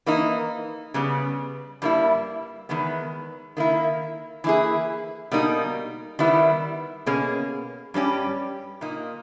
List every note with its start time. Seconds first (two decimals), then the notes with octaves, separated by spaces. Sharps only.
0.06 E3 A#3 D#4
0.94 C#3 G3 B3
1.82 G2 G3 A#3 E4
2.69 E2 D#3 G#3 B3
3.57 D#3 A#3 E4
4.44 E3 A#3 E4 G#4
5.31 B2 G3 A#3 D#4
6.19 D#3 G3 B3 E4
7.06 B2 A#3 C#4 G#4
7.94 G2 G3 C#4 G4
8.81 A#2 A#3 D#4